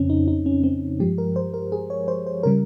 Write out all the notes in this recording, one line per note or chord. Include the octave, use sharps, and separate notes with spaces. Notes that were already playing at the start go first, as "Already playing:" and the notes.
Already playing: F2 C#3 C4 C#4
D#4
D#4
C#4
C4
G2 F3 G#3 G4
A#4
C5
A#4
G#4
C#5
C5
C5
C#3 G3 A#4